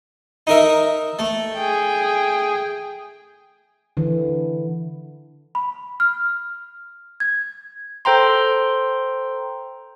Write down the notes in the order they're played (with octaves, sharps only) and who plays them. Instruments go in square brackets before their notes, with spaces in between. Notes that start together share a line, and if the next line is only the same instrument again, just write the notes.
[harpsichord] D#4 A#4 E5
A3
[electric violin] G#4 G5
[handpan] D3 E3
[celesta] B5
F6
G#6
[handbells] A4 C5 G5 A#5 C6